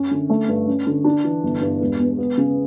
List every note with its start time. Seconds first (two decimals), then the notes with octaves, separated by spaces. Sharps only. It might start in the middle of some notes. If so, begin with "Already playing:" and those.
Already playing: F#2 C#4
0.11 D3
0.30 A3
0.48 G2
0.67 C#4
0.87 D3
1.04 D4
1.24 E3
1.43 G1
1.61 G2
1.81 E1
2.00 E2
2.18 B3
2.38 C#3